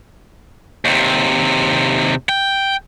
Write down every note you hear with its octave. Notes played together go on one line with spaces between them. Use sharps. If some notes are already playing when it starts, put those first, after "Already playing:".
D#2 C3
G5